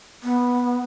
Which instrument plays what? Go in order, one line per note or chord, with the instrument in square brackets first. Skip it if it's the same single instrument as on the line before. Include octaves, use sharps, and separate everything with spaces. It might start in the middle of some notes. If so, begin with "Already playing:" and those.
[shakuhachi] B3